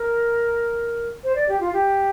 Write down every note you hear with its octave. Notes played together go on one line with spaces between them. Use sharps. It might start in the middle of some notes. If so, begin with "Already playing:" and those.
Already playing: A#4
C5
D5
G4
F4
G4